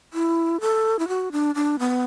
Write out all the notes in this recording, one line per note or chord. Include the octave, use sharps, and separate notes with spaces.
E4
A4
E4
F#4
D4
D4
B3